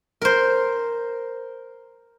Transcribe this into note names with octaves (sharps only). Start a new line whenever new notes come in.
A#4 C5